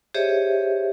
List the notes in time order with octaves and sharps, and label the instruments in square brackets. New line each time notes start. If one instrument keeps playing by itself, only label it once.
[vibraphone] G4 G#4 C5 C#5 D#5 E5